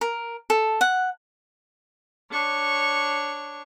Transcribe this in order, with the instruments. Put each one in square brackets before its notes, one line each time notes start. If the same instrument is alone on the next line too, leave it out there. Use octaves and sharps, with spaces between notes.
[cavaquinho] A#4
A4
F#5
[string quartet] D4 C#5 C#6